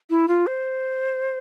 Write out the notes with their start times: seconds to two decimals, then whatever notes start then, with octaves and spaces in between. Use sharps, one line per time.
0.10 E4
0.28 F4
0.47 C5